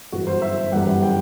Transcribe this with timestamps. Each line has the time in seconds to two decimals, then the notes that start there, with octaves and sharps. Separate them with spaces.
0.12 G1 F#2 E3 F#4
0.27 C5
0.42 E5
0.72 G1 F#2 E3 G3 F#5
1.03 G5